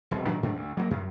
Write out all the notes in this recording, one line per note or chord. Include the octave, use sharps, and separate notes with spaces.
E1 C2
A#2 D#3 F#3 D4
G#2 G3 C4 D4
D2
F#3 G3 A#3
F#2